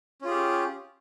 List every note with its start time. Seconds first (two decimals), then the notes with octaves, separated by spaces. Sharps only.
0.22 C#4
0.24 F4
0.27 G#4
0.30 G4